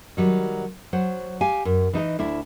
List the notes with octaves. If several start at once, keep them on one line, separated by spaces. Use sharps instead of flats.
D#3 F#3 G3
F#3 C5 F#5
G4 F5 G#5
F#2
E3 D#4 A4 D#5
D2 D4 E4